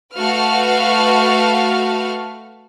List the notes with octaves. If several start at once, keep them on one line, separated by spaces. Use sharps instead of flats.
A3 F#4 B4 F5 F6